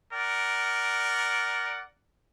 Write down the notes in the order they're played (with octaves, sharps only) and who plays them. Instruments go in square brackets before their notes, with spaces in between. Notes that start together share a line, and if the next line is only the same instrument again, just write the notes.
[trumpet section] A#4 D5 F#5